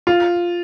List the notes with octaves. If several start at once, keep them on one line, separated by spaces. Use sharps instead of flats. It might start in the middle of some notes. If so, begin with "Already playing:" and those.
F4